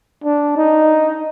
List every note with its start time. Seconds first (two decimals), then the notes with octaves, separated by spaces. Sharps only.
0.24 D4
0.57 D#4